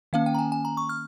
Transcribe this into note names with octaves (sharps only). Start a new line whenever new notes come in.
D#3 A#3 C#4 F5
G5
A#5
G#5
G#5
A#5
C#6
F6